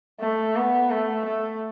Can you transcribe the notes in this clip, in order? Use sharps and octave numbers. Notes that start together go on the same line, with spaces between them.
A3
B3
A3
A3